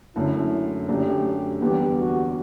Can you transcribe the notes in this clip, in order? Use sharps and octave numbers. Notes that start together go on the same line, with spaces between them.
F#2 D3 A3 E4
F#2 D3 A3 D4 G4
E2 D3 G3 B3 G4
F#4